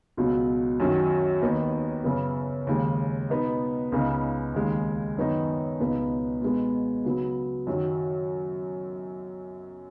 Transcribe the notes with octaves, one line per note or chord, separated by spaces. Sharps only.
C#2 B2 F#3
F#2 D#3 F#3 C#4
D#2 D#3 B3 D#4
F#2 C#3 B3
D#2 C#3 G#3
B2 B3 D#4
C#2 C#3 B3 D#4
D#2 C#3 G#3
F#2 D#3 B3 D#4
C#2 B2 B3 D#4
B2 G#3 B3
C#3 F#3 B3
F#2 D#3 F#3